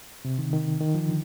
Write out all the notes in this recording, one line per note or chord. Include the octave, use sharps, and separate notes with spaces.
C3
D#3
D#3
D#3
F3
D3